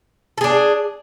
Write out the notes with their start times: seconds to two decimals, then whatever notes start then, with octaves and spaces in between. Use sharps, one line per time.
0.38 A4
0.41 G#4
0.44 D4